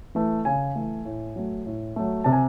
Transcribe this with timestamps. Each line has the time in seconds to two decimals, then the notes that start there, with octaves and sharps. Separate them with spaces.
0.15 E3 A3
0.45 C#3 G#5
0.76 E3 A3
1.05 A2
1.36 F#3 A3
1.66 A2
1.96 F#3 A3
2.24 C3 A5
2.32 G#5